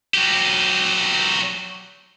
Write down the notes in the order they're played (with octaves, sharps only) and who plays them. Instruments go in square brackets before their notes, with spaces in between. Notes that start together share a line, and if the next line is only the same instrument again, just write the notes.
[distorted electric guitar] F#3 G4